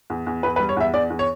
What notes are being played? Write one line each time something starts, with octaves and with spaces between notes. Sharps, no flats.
E2
E2
E2 B4
B4
G3
C#5
E2 E5
E2 D5
E2
C#5